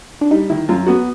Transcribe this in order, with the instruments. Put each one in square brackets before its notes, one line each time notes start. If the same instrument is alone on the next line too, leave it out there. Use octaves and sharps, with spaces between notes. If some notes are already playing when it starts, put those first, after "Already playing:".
[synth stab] D4
[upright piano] G3 [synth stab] D#4
[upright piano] D#3 [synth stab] E4
[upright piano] F#2 [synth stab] F4
[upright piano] B3 [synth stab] F#4